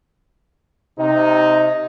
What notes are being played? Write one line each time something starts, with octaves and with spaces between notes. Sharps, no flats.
C3 D#4